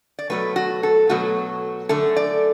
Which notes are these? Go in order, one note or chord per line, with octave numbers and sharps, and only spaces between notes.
D5
B2 F#3 A3 B4
F#4
A4
B2 F#3 A3 F#4
F#2 D3 A3 A4
D5